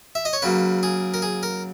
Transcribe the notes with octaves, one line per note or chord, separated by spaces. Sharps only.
E5
D#5
C#5
C#3 F#3 A#3 B4
G#4
A#4
G#4
A#4